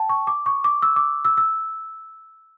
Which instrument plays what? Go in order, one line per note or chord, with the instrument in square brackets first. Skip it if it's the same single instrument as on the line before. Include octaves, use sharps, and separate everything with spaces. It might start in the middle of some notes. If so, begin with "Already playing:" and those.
Already playing: [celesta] G5 A5
C#6
D6
C#6
D6
E6
D6
E6
E6